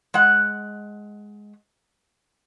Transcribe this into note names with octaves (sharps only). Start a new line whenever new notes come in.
G#3 F#5